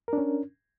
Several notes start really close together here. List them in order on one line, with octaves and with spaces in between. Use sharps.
A#4 D4 C#4